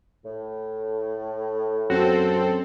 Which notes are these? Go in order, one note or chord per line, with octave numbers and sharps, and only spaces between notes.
A2
F#2 C4 F#4 A4